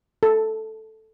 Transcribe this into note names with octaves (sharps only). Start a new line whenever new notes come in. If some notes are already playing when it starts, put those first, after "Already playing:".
A4